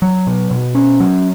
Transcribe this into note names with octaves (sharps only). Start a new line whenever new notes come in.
F#3
B2
B2
C#4
F#3